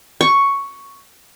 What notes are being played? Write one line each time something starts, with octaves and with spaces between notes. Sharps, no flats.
C#6